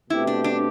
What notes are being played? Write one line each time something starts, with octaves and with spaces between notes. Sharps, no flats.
B2 A3 C4 E4 G4 B4
D4
D4